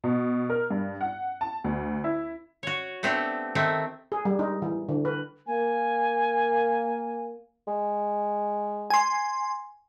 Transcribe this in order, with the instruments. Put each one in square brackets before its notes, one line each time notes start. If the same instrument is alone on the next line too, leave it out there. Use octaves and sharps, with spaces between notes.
[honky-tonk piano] B2
A#4
G2
F#5
A5
D2
E4
[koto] F#4 C#5
A3 B3 C4 D4 G4
D#3 A3 C4
[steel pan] G#4
G3
D#4
E3
D3
B4
[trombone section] A#3 [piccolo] G#5
[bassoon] G#3
[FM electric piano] G#5 C6